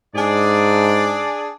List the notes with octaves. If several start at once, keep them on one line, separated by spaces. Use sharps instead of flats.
G#2 D4 G#4 D5